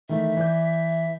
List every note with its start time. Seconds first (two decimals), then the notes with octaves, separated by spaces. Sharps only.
0.09 D#3 E3 A3 E5
0.37 E3 D5 G6